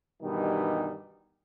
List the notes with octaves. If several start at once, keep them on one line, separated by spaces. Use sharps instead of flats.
G2 B2 D#3 E3 G3 D#4